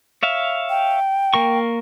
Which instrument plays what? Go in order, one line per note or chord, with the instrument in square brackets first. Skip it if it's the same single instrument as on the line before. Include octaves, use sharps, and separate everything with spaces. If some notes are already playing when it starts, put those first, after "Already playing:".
[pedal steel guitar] C#5 E5 F5
[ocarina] G5
[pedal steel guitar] A#3 A#4 C#6